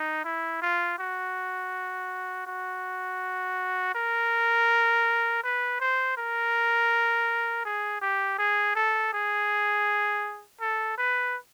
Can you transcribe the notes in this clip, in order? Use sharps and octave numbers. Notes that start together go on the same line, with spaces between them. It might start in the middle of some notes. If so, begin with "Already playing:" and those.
Already playing: D#4
E4
F4
F#4
F#4
A#4
B4
C5
A#4
G#4
G4
G#4
A4
G#4
A4
B4